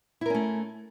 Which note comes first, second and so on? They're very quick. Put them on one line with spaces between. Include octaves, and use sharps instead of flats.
E4 A#4 C#4 A3